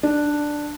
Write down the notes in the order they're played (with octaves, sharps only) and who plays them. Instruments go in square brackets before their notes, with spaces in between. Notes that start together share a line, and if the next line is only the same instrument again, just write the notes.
[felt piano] D4